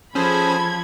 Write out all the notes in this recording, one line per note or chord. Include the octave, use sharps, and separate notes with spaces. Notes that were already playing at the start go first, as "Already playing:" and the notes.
F3 C#4 G#4 A4 C5 B5 G#6